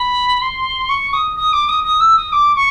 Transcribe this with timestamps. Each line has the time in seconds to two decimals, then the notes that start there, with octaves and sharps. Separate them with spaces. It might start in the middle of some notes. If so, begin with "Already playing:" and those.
Already playing: B5
0.41 C6
0.89 C#6
1.13 D#6
1.36 D#6
1.53 D6
1.68 D#6
1.84 D#6
2.00 E6
2.16 D#6
2.32 D6
2.55 C#6